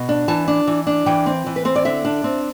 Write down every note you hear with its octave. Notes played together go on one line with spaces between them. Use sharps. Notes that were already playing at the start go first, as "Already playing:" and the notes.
Already playing: B2
D4
E3 A5
D4
E3
D4
E3 G5
C4
E3
B4
C4 C5
D5
D3 E5
D4
C4